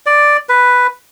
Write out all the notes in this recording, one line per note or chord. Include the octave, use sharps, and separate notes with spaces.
D5
B4